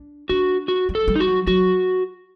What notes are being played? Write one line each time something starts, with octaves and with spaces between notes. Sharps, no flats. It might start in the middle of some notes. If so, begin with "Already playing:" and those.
Already playing: D4
D4 F#4
F#4
G3
A4
G3
D#4
F#4
F#3
F#3 F#4